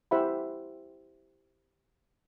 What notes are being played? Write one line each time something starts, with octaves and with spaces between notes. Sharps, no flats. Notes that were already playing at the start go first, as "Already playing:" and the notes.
E4 G4 C5 E5 F#5 B5